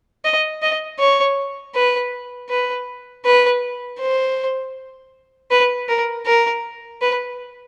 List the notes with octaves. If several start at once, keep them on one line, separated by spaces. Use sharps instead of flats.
D#5
D#5
C#5
B4
B4
B4
C5
B4
A#4
A#4
B4